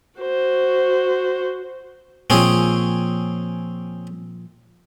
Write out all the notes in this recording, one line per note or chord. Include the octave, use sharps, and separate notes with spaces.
F#4 C5
A#2 F3 C4 C#4 G#4